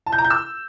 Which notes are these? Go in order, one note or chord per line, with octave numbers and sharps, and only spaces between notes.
A5
G6
A#5
G6
E6